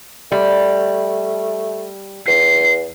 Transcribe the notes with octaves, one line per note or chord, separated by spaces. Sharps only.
G3 A3
E2 C7